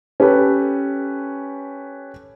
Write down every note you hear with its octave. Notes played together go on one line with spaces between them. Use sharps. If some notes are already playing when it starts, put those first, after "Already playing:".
C#4 G4 A4 B4